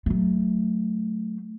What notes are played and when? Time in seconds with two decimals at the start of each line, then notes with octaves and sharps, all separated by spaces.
0.06 F#3 A3